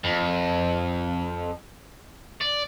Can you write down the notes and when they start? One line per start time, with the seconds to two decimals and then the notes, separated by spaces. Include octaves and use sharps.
0.04 F2
2.41 D5